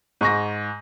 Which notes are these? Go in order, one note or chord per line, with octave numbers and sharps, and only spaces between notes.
G#2 C#6 A#6